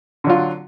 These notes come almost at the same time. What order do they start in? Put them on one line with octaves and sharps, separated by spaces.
D3 F#3 F4